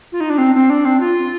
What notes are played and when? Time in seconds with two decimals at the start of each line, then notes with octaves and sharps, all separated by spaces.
0.12 F4
0.20 D#4
0.30 D4
0.38 C4
0.54 C4
0.70 D4
0.85 C4
1.00 F4